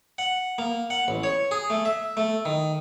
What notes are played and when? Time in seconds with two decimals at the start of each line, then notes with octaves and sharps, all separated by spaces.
0.18 F#5
0.58 A#3
0.90 F#5
1.08 A1
1.23 C#5
1.51 G#4
1.70 A3
1.85 E5
2.17 A3
2.45 D#3